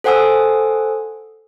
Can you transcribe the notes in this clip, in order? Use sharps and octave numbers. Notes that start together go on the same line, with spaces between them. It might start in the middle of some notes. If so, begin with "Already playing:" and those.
A4 C5 F#5 G#5 D#6 E6